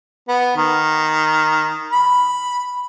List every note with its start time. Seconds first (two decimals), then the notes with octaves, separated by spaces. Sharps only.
0.28 B3
0.56 D#3
1.92 B5